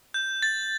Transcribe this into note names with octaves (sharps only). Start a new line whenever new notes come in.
G6
A6